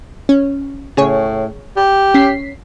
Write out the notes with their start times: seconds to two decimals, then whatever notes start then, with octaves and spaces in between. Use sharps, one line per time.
0.29 C#4
0.97 A2 C#3 G#4 C#5
1.77 G4
2.14 C#4 B6 C7